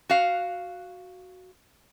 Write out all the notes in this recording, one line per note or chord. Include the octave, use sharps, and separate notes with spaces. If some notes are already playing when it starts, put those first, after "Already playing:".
F#4 F5